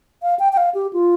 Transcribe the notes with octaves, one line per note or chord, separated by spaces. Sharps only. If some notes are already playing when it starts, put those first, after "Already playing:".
F5
G5
G5
F5
G4
F4